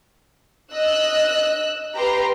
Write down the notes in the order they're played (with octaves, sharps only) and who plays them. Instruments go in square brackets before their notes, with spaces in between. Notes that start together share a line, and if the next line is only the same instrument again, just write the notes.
[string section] D#5 [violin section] E6 F#6
[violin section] G4 B4 C6 [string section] A#5